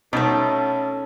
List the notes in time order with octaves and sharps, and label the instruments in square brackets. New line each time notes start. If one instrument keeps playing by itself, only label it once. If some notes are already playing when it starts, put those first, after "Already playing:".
[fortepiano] B2 [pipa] A3 D#4 [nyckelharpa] C#4 A4